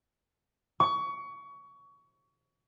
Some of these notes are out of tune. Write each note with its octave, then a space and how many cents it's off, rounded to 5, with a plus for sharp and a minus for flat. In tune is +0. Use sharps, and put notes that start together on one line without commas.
C#6 +25